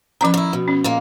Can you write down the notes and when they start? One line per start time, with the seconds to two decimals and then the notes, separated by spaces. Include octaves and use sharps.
0.21 F3 C#4 B4 G5 A#5
0.34 D#3 E4
0.53 B2
0.68 C#4
0.84 A#2 G#3 A#3